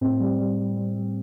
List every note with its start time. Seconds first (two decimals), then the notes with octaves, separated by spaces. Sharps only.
0.01 A2 C4
0.20 G3
0.39 G3
0.58 G3
0.77 G3
0.95 G3